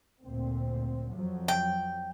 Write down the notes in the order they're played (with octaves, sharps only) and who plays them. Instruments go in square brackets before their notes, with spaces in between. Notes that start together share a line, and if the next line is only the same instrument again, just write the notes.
[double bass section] D2 A#2 C4
F2 F3 F#3
[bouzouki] G5